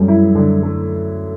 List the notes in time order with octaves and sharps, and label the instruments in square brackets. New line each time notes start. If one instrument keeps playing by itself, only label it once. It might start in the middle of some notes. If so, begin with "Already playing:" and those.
Already playing: [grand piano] F#2 A3 [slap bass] G3
[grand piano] E4
D3
A3